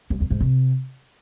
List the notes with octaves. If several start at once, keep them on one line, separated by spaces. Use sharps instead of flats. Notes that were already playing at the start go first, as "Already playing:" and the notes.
F#2
E2
G#2
C3